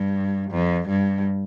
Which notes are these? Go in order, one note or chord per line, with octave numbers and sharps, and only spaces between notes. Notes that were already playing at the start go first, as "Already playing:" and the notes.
Already playing: G2
F2
G2